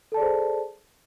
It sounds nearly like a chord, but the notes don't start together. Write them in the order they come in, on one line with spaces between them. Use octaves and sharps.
A4 A5 D5 G#4 C5